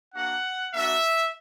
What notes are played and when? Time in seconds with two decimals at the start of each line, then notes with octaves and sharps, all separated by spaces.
0.14 A#3 D4 F#4 F#5
0.74 A#3 D4 F#4 E5